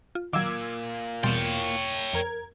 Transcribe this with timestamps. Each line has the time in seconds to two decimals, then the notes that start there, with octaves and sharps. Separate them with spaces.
0.15 F4
0.33 D#3 F#3 A#3 F4 D6 E6 G#6
1.24 E2 B2 G3 C#5 G5 C6 A6
2.13 F2 A#4 G#6